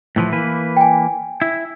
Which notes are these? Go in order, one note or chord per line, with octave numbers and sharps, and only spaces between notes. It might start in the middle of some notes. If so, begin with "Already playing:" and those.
A2 E3 F3
E3 A#3 B4
G5 G#5
E4